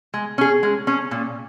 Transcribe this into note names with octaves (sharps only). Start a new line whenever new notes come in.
G#3
C#4 G#4
G#3
C#4 G#4
A#2